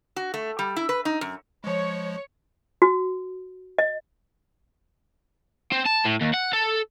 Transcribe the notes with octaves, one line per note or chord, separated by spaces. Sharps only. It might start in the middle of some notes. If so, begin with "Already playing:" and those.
F#4
A3
G3
E4
B4
D#4
F#2
F3 G#3 C#5
F#4
D#5
C4
A5
A2
D#2
F#5
A4